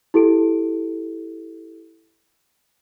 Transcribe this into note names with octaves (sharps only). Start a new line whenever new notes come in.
E4 G4 A4 D7